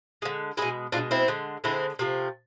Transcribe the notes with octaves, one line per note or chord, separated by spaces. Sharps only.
D3 G#3
B2 G#3 E4 G#4
B2 G#3 D4 F4
C4 E4
D3 G#3
D3 G#3 C4 E4
C3 F3 A3